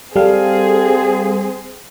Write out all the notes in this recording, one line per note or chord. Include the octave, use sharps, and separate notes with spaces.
G3 C4 G#4 A4 F5